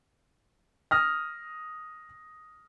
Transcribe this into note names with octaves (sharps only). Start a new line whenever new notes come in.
D#6 F6 A#6